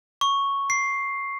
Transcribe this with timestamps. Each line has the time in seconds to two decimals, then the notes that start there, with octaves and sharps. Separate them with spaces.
0.21 C#6
0.70 C7